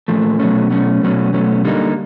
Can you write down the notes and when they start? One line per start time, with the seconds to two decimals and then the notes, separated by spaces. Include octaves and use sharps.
0.08 A#2 F3 A3
0.39 B2 F#3 A3 C#4
0.70 B2 F#3 A3 C#4
1.01 B2 F#3 A3 C#4
1.33 B2 F#3 A3 C#4
1.65 D3 G3 A#3 D#4